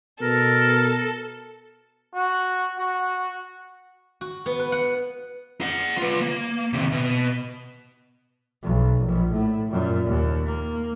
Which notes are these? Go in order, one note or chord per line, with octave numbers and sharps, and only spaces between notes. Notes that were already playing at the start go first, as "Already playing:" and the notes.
B2 A4 A#4
F#4
F#4
F#4
B3
B4
F#5
G#4 F#5
F4 B4
A#3
C3 D#3
B2
B1
A#1
A2
F#2 A#2
D#2
A#3